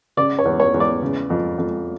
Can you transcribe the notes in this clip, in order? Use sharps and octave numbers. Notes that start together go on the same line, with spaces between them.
C#3 D5
C#5
E2
C#5
E2
D5
C#3
F2
F2